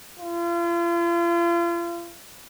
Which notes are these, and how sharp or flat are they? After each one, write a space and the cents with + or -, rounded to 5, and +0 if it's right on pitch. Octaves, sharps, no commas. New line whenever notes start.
F4 -40